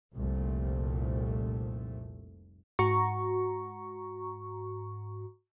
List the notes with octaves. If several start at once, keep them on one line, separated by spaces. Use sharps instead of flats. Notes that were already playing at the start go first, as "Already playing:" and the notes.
F1 C2 F2 A#2 A3
G#2 F#4 A#5 C#6